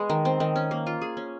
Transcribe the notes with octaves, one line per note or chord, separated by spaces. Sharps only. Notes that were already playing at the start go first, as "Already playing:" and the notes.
Already playing: G#3 B3
D#3
C4
D#3
C#4
A#3
F4
G#4
C#4